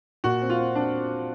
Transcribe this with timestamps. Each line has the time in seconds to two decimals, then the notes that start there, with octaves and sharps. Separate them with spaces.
0.24 A#2 F#4
0.42 C4
0.50 F4
0.59 C4
0.75 C4 D4